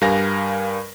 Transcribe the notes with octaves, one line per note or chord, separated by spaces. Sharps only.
G2 G3 A#4 F5 G#5 A#6